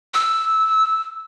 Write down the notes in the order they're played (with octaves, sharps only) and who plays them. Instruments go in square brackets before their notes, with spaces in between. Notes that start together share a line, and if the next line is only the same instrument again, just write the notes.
[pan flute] E6